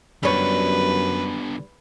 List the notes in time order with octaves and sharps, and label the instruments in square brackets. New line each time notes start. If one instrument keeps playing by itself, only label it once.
[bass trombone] F#2 [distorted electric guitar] D3 B3 [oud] G3 C#5 [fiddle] B4